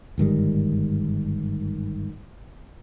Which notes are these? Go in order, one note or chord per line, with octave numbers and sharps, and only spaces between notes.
G1 G#2 D#3 G3